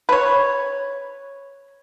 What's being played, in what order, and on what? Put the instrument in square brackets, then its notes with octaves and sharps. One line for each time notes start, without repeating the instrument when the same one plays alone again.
[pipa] B4 C#5